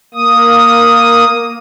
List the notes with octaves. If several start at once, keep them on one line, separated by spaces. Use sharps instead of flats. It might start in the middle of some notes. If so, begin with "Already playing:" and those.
A#3 D#6